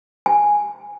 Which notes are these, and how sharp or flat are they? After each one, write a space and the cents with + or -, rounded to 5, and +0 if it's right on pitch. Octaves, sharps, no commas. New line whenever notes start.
G#5 +0